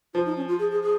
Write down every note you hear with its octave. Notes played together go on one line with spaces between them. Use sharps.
F3 F4
D#4
C#4
F4
G#4
G#4
G#4